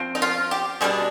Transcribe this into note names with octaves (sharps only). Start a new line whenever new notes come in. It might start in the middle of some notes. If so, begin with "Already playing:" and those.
Already playing: F3 C4
D#4
F4
G4
B2 G3 D4 G#4